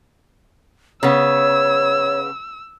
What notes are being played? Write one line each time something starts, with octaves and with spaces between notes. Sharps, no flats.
C#3 B3 C#5 E6